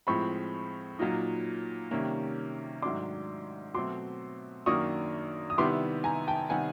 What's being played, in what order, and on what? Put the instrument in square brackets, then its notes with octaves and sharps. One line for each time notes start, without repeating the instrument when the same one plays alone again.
[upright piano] A2 F3 G#3 C4 B5 C#6
A#2 F#3 A#3 D#4
C3 D#3 G3 A#3 C#4
G#2 D#3 F#3 A3 D4 C6 D6
B2 F#3 A3 C4 C6 D6
F#2 D#3 F#3 A#3 D4 C#6 D#6
D#6
C3 D#3 G3 B3 E4 C6 D6
G#5 A#5
G5 A5
C3 D#3 G3 B3 F#5 G#5